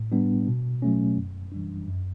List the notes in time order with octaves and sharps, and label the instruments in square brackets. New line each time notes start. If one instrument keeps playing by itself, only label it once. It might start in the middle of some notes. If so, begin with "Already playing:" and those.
Already playing: [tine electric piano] A2
G3 B3 D4
B2
F#3 A3 C#4
F#2
E3 G3 D4
F#2